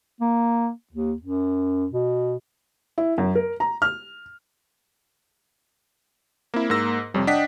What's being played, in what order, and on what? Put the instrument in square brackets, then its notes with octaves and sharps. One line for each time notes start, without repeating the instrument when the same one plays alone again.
[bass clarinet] A#3
D#2
F#2
B2
[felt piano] E4
F#2
A#4
A#5
F6
[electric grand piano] A#3 E4 [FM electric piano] C4
[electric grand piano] G#2 E6 [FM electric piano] A#3 A#4 A#6
[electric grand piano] F2 C3 [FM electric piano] G3 C#5
[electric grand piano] D4 F#5 B6 [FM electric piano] D#5 G5 D#6